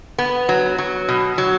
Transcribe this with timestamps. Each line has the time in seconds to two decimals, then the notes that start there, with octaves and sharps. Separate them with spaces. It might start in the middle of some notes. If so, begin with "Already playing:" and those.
0.18 B3
0.49 F#3
0.78 F#3
1.09 B2
1.38 F#3